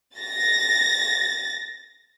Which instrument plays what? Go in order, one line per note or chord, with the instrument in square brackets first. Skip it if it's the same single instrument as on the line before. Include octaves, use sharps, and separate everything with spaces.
[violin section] A6 A#6